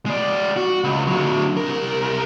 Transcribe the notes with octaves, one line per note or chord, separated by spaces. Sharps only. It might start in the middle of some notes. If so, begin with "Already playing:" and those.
G#3 D5
F#4
C#2
D3 F#3
C2 A#4